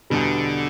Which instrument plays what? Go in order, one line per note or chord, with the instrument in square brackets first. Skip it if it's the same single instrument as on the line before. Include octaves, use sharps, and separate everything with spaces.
[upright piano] E2 B2 G3 [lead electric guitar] D3